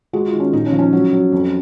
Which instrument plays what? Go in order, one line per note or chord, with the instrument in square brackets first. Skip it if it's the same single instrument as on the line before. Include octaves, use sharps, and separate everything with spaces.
[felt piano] G#3 F#4
F4
D#3
C#4
A#1 D#4
C#4
F3
C#4
F#3
F#3
F2